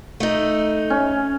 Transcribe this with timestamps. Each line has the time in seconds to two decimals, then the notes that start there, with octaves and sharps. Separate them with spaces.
0.20 A3 D#4
0.90 C#4